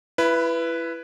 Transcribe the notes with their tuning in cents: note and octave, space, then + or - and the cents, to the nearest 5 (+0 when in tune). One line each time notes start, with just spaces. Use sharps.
E4 +25 B4 +0